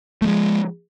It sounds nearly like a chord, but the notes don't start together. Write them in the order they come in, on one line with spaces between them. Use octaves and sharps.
A3 F3 G#3